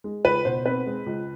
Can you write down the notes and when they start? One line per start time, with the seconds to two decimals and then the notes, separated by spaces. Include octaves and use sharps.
0.04 G#3
0.24 C#2 B4
0.45 B2 C5
0.65 C4 B4
0.86 G#3
1.06 C#2